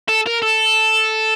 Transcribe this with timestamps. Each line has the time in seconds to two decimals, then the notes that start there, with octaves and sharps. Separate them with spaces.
0.08 A4
0.26 A#4
0.42 A4